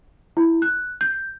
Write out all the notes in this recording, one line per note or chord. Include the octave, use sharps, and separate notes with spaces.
E4
F#6
G6